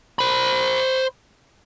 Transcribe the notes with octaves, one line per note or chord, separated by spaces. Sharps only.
C5 B5